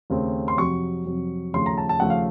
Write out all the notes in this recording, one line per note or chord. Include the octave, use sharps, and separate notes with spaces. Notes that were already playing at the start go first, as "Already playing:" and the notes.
D#2 C#3 A3 C4
C6
F2 C3 F#3 C#6
F2 C3 F#3
D#2 C#3 F3 A3 C6
A#5
A5
A5
D#2 C#3 F3 A3 F#5
F5